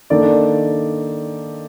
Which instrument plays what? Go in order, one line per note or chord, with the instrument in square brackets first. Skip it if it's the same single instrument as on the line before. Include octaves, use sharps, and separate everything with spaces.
[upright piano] D#3 A#3 D4 A4 D5